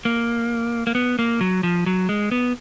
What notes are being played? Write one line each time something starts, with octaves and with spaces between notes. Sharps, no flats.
A#3
A#3
B3
A#3
F#3
F3
F#3
G#3
B3